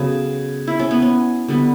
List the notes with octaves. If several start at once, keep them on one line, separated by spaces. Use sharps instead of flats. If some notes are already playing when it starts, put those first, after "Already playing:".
Already playing: C#3 F#3 B3 A4
E4
C#4
B3
C#4
D3 G3 B3